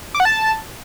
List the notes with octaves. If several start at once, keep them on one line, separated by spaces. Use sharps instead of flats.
D6
F#5
A5